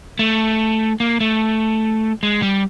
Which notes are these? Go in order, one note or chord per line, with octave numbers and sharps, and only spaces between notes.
A3
A#3
A3
G#3
G3